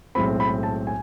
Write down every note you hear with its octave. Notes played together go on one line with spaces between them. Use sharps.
B1 A2 G#3 C4 B5
B5
A5
G#5